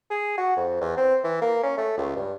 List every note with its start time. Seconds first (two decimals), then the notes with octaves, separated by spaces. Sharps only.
0.10 G#4
0.38 F#4
0.57 F2
0.81 E2
0.97 C4
1.24 E3
1.42 A#3
1.63 C#4
1.78 A3
1.97 C#2
2.16 G2